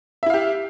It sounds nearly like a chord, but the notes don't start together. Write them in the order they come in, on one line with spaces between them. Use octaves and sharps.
E5 E4 F5 G4